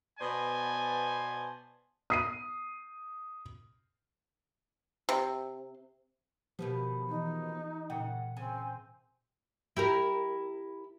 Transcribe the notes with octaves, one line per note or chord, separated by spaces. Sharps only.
B2 B3 C5 D5 G#5 A5
D#6 C7 D#7
C3
B2 D#3 F3 B3 G4
E3 D#4
A#2 C#3 F#5 G5
C#3 C4 G#5
E4 G4 A#4